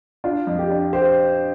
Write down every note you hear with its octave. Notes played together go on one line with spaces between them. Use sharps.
D4 F4
F2
G4
D4
G4 C5